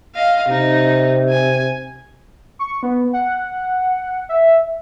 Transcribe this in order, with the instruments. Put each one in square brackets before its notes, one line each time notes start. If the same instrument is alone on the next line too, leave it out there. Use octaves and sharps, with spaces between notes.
[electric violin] D#5 F5
[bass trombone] C3 [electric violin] D#4
[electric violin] G#5
[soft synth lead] C#6
B3
F#5
E5